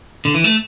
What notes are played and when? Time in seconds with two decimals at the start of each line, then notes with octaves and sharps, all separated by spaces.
0.25 D3
0.34 E3
0.44 A3